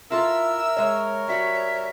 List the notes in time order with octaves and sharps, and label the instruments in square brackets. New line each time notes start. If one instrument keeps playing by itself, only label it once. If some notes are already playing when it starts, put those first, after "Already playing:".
[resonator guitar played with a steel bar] E4 F4 A4 [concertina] A#4 [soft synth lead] E5 [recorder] E6
[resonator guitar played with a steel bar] G#3 E5 [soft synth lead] C#5
[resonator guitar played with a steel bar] G3 F#4 [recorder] E5